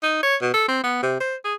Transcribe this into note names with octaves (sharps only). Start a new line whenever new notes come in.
D#4
C#5
B2
A4
C4
B3
C3
C5
G#4